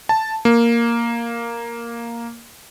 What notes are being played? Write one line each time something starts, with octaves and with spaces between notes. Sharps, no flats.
A5
A#3